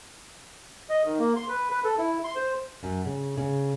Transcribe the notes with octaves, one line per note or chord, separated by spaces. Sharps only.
D#5
D#3
A#3
C6
B4
B4
A4
E4
C6
C5
F#2
C#3
C#3